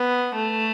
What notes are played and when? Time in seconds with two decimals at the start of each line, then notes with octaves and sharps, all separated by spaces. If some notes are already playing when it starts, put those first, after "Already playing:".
Already playing: B3
0.35 A3